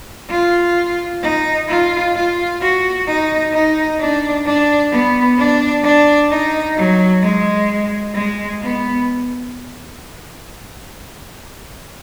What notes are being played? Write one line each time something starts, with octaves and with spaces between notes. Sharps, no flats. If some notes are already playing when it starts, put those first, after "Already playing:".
F4
D#4
F4
F4
F#4
D#4
D#4
D4
D4
B3
D4
D4
D#4
F#3
G#3
G#3
B3